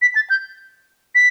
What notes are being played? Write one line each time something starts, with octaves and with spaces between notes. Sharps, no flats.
B6
A6
G6
B6